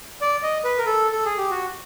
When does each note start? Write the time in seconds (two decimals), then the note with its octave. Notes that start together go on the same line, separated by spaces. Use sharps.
0.21 D5
0.43 D#5
0.64 B4
0.78 A#4
0.86 A4
1.12 A4
1.25 G#4
1.38 G4
1.51 F#4